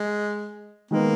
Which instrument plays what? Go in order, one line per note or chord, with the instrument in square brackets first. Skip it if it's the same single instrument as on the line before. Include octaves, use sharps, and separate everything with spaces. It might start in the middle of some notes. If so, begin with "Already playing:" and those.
Already playing: [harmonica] G#3
[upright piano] D#3 G#3 B3 [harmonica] A#3